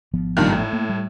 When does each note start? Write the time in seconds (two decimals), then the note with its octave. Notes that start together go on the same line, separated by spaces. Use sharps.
0.13 G#1 F3 B3
0.37 G2 A#2 D#3
0.52 A2
0.73 A#3
0.89 G3